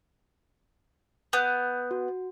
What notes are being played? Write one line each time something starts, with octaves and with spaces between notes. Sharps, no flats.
B3 F#6 G6
F#4